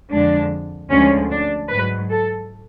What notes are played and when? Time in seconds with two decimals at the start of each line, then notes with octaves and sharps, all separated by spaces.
0.11 F2 D3 G#3 D4
0.90 D2 D3 F3 G#3 C#4
1.31 D4
1.70 G#2 F#3 B4
2.11 A4